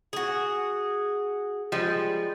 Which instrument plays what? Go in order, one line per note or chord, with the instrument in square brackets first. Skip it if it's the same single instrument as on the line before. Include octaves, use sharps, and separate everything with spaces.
[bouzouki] F#4 G#4
[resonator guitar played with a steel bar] F3 G3 G#3